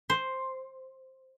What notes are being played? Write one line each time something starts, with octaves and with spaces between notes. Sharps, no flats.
C5